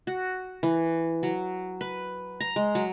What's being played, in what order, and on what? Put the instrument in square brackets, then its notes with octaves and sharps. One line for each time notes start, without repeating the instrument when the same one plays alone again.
[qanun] F#4
E3
F#3
B4
A#5
G#3
F#3